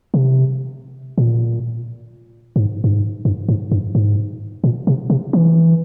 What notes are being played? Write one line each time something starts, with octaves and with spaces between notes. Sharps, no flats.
C3
A#2
G#2
G2
G#2
G2
G#2
G2
G#2
A#2
C3
C3
E3